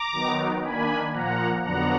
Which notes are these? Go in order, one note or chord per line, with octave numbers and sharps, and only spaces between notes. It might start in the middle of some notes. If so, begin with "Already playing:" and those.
Already playing: A#5 D6
D#3 F#3 B3 D#4
D#3 A#3 D4 G#5 B5
A#2 F3 A#3 F#5 A#5
F2 D3 F#3 B3 D4 F#5 A#5